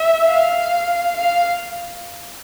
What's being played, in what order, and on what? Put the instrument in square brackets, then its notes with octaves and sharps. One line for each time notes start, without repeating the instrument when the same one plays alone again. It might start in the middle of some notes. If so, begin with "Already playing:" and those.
Already playing: [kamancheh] E5
F5
F5